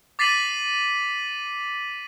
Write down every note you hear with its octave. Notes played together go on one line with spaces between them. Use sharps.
D6 A6 B6 C7 D#7 F#7